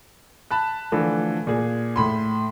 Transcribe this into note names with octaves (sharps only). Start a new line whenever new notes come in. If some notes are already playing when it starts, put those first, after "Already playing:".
A5 B5 F#6
D3 E3 F3 A3
A#2 G#4
A2 B5 C6